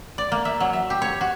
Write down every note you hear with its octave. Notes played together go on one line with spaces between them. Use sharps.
D5
A#3
E5
F#3
E5
G4
C#5
F#4